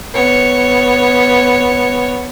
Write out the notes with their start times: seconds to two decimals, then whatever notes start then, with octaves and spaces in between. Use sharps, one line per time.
0.14 B3 C#5